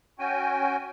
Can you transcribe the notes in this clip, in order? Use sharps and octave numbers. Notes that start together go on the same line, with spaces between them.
C#4 F#4 G5 G#5